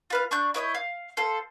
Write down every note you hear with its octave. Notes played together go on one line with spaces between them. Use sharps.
F4 B4 F5
D4 C#6 F#6 G6
E4 C#5 D#5 G6
F5
F4 A4 C5